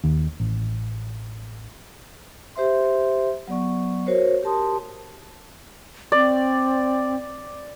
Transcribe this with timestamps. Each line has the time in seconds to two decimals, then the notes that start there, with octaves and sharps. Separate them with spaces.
0.04 D#2
0.40 A1
2.55 G4 C5 E5 C6
3.47 F#3 B3 D5 C#6
4.06 F#4 A#4 C5 C#5
4.43 G4 A#4 A5 C6 D#6
6.12 C4 D5